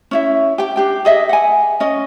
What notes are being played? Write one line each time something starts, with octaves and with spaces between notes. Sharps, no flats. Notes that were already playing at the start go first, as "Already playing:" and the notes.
C#4 E4 E5
G4 G5
D4 G4 G5
G#4 D#5 E5
F#5 G#5
C#4 D#5